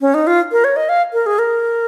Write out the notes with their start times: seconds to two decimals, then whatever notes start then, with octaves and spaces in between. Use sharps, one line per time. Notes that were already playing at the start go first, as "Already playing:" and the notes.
0.01 C#4
0.14 D#4
0.27 F4
0.52 A#4
0.64 C#5
0.76 D#5
0.89 F5
1.13 A#4
1.26 G#4
1.39 A#4